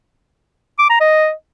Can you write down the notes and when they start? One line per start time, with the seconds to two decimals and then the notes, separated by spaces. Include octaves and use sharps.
0.79 D6
0.90 A#5
1.00 D#5